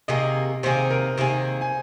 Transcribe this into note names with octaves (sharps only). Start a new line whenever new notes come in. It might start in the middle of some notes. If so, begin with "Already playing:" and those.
C3 D#3 A#3 G#4 D#5
C3 D#3 A#3 G#4 C5
A#4
C3 D#3 A#3 G#4 C5
G#5